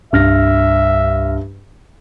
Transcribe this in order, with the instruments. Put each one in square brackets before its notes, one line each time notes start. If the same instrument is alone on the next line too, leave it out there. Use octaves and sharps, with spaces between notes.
[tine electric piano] C2 F6 A#6 [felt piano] G2 [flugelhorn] E5